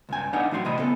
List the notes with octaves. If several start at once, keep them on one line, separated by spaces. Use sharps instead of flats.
C#2 G2 G#5
D4 D#4 B4 D#5 F5 F#5
A2 E3 F#3 C5 C6
A2 C3 D#5 B5
C#3 B3 A4